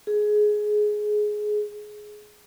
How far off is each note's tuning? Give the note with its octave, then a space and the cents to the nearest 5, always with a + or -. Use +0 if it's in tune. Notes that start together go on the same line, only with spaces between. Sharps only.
G#4 +15